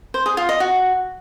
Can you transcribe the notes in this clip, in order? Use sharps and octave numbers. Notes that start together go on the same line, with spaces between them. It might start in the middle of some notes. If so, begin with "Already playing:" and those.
C5
G#4
F4
D#5
F#4